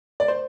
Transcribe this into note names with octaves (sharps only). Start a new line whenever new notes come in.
D5
C5